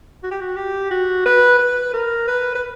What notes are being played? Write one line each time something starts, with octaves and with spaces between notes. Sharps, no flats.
F#4
G4
F#4
G4
F#4
B4
B4
A#4
B4
B4